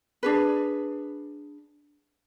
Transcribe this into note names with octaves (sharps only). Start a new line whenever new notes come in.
D4 G#4 B4